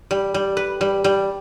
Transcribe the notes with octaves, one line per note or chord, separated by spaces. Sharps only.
G3
G3
B4
G3
G3